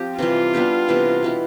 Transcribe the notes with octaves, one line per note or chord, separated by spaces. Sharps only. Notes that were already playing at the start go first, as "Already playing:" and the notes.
Already playing: F3 C4 G4
C3 E3 G3 F4
G3 B3 D4 G4
C3 E3 B3 E4
B2 B3 E4